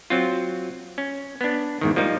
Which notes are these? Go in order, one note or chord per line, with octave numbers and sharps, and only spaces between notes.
F#3 C4 F4
C#4
B3 D4
E2 G#2 D#3
F3 G3 A#3 D#4